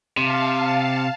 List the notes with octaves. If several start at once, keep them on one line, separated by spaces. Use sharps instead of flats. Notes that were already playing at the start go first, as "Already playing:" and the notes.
C3 F5 A5